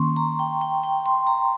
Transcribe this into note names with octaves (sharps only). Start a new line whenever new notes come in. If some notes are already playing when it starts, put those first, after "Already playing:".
Already playing: D#3 A#3 C#4 C6 C#6
A#5
G5
G5
G5
C6
A#5